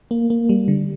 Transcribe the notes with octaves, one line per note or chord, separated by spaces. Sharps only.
A#3
A#3
G3
D3